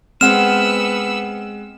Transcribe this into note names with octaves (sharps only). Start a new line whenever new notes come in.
G#3 B3 C4 F#5 E6 F6 E7